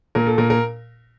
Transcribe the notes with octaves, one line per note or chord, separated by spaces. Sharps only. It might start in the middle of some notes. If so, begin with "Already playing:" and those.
A#2 A#4
A4
A#2 A#4
A#4